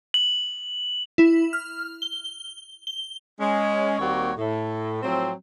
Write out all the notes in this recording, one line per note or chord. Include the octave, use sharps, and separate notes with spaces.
F#7
E4
F6
G7
G7
G#3 C#4
D#2 G3 A#3 C4 F#4 C#5
A2
A2 F3 F#3 C4